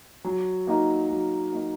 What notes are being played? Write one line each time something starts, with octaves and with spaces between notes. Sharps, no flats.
F#3
A#3 D#4 F#4
F#3
A#3 D#4 F#4